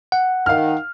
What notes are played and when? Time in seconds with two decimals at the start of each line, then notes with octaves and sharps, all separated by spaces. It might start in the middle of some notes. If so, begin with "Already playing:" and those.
0.12 F#5
0.46 D#3 F5 F6